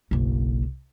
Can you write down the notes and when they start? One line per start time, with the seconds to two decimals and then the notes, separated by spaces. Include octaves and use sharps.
0.11 F#1 B1